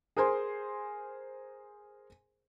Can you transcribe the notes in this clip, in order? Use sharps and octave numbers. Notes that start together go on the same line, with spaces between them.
G#4 A#4 C5 G#5 C6